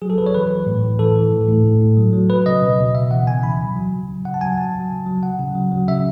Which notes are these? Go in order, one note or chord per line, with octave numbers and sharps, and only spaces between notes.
F#3 G#4
A4
F#3 B4
C#5
E3 B4
E3
A2
A2
E3 A4
E3
A2
A2
A2
A2
F#3
F#3
F#3 B4
C#3 D#5
B2
B2
C#3 E5
E3 F#5
C#3 G#5
E3 B5
F#3
F#3
C#3
F#3
C#3 F#5
A5
F#3 G#5
F#3 A5
F#3
C#3
F#3
C#3 F#5
C#3
F#3
F#3
C#3 E5